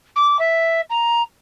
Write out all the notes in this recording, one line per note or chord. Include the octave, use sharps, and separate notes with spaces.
D6
E5
A#5